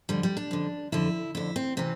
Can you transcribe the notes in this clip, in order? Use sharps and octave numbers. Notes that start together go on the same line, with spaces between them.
F2 D3 G3
G3
D4
F2 D3
F2 D3 E4
F2 D3 E4
C4
C3 E3 C4